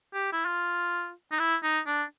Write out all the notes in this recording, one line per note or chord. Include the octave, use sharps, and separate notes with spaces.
G4
E4
F4
D#4
E4
D#4
D4